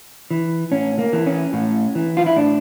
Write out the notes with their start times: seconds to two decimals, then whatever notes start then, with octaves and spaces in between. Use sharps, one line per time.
0.31 E3
0.71 A2 C#4
0.99 A#3
1.13 E3
1.26 C#4
1.53 A2
1.95 E3
2.17 F4
2.26 E4
2.36 A2 D4